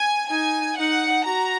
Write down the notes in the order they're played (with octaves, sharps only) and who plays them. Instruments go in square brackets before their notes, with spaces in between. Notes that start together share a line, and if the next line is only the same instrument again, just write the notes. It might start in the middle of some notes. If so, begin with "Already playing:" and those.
Already playing: [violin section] G#5
[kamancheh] D#4 [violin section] G#5
[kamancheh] D#4 [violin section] F#5
[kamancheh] F#4 [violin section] A#5